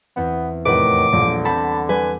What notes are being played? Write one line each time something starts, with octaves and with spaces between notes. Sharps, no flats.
E2 B3 C4
F1 A2 D#3 B4 C#5 F#5 D6
A#1 D3 G3
C4 F#5 A5 B5 A#6
G3 B4 G#5